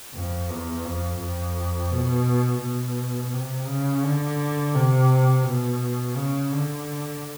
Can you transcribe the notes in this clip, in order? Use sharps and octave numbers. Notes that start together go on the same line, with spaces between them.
F2
E2
F2
F2
B2
B2
C3
C#3
D3
C3
B2
C#3
D3